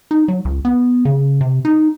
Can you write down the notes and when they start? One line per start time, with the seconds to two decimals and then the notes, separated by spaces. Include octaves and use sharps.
0.11 D#4
0.28 F#3
0.45 C#2
0.65 B3
1.05 C#3
1.41 C3
1.65 D#4